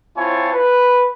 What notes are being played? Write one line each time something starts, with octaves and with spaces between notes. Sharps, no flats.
C4 E4 F4 C#5 G#5 A5
B4